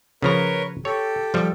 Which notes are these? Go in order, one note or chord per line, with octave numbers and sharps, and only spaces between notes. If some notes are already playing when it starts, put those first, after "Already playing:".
C#3 F3 A#4 B4 C#5 A#5
G4 A4 C#5
F3 G3